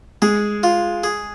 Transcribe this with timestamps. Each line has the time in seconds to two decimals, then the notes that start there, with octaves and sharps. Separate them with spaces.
0.22 G#3 G#4
0.63 F4
1.04 G#4